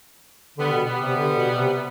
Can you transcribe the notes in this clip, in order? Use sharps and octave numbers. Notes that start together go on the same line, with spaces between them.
D3 G3 B3
B2
G3 B3
C3
D3
B2
C3